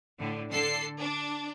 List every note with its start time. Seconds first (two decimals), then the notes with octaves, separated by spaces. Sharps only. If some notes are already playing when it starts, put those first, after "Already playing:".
0.19 A2 D3
0.51 D3 A4 C7
1.00 D4